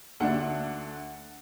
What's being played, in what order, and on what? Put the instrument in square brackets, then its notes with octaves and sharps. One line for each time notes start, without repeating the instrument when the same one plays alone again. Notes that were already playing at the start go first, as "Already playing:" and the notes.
[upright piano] D2 D3 A3 D4 F#5